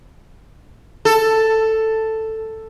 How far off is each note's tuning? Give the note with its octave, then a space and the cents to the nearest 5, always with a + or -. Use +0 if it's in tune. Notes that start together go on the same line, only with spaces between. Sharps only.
A4 +5